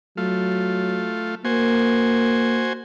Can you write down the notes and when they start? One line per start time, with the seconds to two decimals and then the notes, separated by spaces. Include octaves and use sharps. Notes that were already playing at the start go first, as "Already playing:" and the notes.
0.17 F#3 A3 F4
1.45 A#3 F#4 C5 G#5